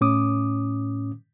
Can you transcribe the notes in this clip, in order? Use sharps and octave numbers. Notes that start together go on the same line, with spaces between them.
A2 C#4 D6 D#6